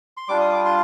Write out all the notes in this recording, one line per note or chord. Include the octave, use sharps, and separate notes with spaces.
C6
G3 D4 F4 D6
D#6
D6
C6